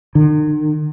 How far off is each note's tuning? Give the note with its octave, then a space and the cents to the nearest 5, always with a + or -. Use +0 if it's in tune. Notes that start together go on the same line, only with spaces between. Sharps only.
D#3 -45